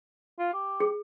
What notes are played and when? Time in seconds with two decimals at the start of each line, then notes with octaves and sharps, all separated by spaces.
0.39 F4
0.54 G4
0.80 G#4